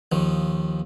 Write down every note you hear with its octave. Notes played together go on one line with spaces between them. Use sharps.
D#2 D#3 F3